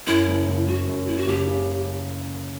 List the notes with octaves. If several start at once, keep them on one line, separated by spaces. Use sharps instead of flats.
F#2 E4
F#1
F#1
F#1 F#4
F#2
F#1 E4
F#4
F#1 G4
C#3